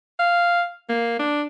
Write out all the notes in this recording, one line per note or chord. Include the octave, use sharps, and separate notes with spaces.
F5
A#3
D4